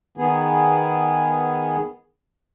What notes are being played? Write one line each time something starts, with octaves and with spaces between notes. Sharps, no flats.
D#3 B3 G#4